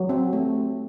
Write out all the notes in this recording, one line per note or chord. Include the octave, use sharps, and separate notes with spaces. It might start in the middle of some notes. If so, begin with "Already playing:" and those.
Already playing: F#3
C4
A3